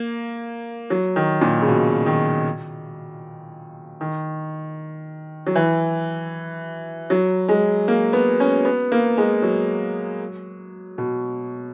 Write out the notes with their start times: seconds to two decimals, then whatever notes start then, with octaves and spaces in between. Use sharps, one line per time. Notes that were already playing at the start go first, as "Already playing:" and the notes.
Already playing: A#3
0.90 F#3
1.16 D#3
1.41 A#2
1.61 C#3
1.68 B2
2.06 D#3
4.01 D#3
5.47 F#3
5.56 E3
7.10 F#3
7.48 G#3
7.88 A#3
8.13 B3
8.40 C#4
8.65 B3
8.92 A#3
9.17 G#3
9.42 F#3
10.98 B2